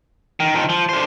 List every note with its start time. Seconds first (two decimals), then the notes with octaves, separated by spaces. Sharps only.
0.40 D#3
0.55 D#3 F3
0.69 F3
0.89 D3 C5